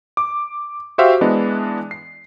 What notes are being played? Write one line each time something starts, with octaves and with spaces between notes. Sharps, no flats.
D6
F#4 G4 C5 E5 F5
E3 G#3 B3 D4 D#5
C7